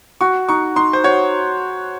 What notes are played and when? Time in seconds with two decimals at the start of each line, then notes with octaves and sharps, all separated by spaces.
0.21 F#4 C#6
0.49 D#4 C#6
0.76 D#4 C6
0.93 C5
1.04 F#4 C#5